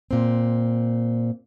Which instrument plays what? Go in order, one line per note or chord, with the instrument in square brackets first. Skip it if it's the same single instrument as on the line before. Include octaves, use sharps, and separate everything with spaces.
[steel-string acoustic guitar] A#2 C4